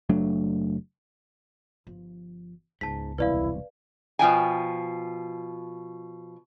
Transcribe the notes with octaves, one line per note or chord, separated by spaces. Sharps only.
F#1 F#3 A3 D4
G1 F3
C#2 G#2 B3 A5 B6
E1 C2 E4 B4 D5 F5
B2 F3 G5 G#5